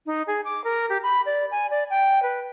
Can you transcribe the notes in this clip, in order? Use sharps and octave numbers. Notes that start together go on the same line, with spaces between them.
D#4
G#4
D6
A#4
G4
B5
D5
G#5
D5
G5
B4